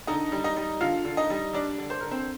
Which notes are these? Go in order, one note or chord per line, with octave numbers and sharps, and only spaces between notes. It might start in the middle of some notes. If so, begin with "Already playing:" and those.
D3 D#4 D#5
G3
D#4 D#5
G3
D3 F4 F5
D3
D#4 D#5
G3
G3 D4 D5
D3
C5
D3 A#4
C4 C5